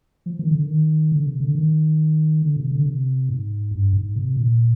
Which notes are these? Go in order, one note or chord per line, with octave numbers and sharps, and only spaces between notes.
F3
D#3
D3
D#3
D3
C3
D3
D#3
D3
C3
D3
C3
G#2
G2
G#2
C3
A#2